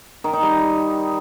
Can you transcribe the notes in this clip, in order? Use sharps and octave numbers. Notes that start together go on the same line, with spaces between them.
D#3
D#4
G3